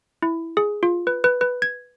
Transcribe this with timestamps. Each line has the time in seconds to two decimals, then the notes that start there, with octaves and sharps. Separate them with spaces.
0.23 E4
0.57 G#4
0.83 F4
1.07 B4
1.24 B4
1.41 B4
1.62 G#6